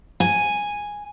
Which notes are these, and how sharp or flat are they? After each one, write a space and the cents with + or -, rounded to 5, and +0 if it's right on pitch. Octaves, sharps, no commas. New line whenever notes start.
G#5 -5